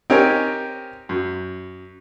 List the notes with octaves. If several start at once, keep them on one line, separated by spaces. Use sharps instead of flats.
C4 D#4 G4 A#4 C#5 G#5
F#2